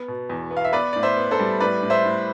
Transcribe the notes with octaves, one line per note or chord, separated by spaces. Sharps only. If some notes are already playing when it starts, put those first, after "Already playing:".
Already playing: B3
B2
E2
B3
F5
E5
B3 B4 D5
A2 D5
C5 E5
B3
A4 C5
G3
A2 B4 D5
A2
C5 E5
A2